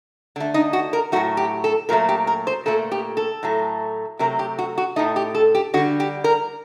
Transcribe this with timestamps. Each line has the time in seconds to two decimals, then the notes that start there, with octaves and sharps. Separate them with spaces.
0.36 D3 A3
0.54 D#4
0.73 F#4
0.93 A#4
1.12 A2 F#3 A3 F#4
1.37 G4
1.64 A4
1.89 A#2 F#3 A3 A#4
2.09 G4
2.27 A#4
2.47 C5
2.66 A#2 A3 A4
2.92 G4
3.17 A4
3.43 A2 F#3 A3
4.19 C3 F#3 A3 A#4
4.39 G4
4.59 F#4
4.78 F#4
4.96 A3 D#4
4.99 A2
5.16 G4
5.35 A4
5.55 G4
5.74 D3 F#4
5.77 G3
6.00 G4
6.24 A#4